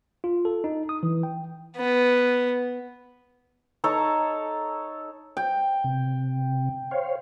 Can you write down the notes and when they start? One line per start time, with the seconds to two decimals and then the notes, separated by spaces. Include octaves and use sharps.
0.24 F4
0.45 A4
0.64 D#4
0.89 D#6
1.03 E3
1.23 G5
1.76 B3
3.84 D#4 A4 C#5
5.37 G5
5.84 C3
6.91 C5 C#5 F5